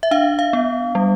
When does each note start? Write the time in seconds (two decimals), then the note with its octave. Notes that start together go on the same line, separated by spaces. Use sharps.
0.03 E5
0.11 D4 F5
0.39 F5
0.53 B3
0.95 G3